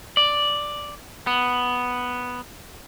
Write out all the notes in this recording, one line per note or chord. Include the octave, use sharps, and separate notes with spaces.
D5
B3